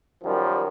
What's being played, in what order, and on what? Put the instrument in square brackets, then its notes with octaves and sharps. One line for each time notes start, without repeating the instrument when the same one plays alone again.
[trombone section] F#2 D#3 F3 G3